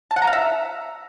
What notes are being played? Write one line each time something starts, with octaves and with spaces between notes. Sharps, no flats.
A5
F#5
A#5
F5
E5